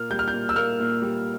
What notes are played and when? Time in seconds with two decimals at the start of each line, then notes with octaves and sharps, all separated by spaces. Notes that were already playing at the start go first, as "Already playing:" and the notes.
Already playing: A#2 A#3 F6
0.10 G3 G6
0.19 F6
0.28 G6
0.34 A#2
0.49 E6
0.56 A#3 F6
0.80 A#2
1.02 G3